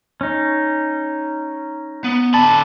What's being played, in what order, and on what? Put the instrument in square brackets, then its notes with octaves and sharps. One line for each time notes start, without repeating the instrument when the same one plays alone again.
[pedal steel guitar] C#4 D#4
[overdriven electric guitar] B3
[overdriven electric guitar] D3 B5 [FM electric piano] A5